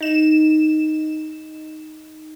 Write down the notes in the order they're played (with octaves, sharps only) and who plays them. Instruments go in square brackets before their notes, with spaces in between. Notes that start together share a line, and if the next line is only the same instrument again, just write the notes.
[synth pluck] D#4 E7